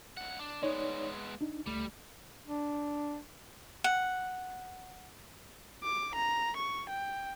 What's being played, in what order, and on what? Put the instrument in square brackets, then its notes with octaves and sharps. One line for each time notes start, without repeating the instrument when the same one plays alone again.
[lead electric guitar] C#2 F#5
D4
[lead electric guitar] G#3 B3 [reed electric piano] D#4 C#5 D5
[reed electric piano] D4 D#4
[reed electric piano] C#2 A3 [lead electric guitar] G3
[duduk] D4
[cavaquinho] F#5
[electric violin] D6
A#5
C#6
G5